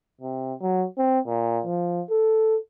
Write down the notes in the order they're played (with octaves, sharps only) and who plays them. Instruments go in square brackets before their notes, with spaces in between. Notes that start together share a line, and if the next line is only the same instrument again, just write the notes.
[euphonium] C3
F#3
C4
A#2
F3
A4